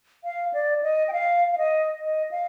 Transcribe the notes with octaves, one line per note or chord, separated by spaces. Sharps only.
F5
D5
D#5
G5
F5
F5
D#5
D#5
F5